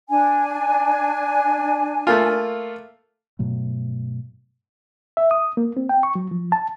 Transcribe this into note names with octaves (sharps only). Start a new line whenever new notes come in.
D4 G#5
A3 A#3 F4
G2 B2 F#3 A3
E5
D#6
A#3
C4
G5
C#6
F#3
F3
A5